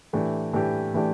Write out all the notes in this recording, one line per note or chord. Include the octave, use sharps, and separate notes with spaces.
A2 E3 A3 D4 G4
A2 E3 A3 D4 G4
A2 E3 A3 D4 G4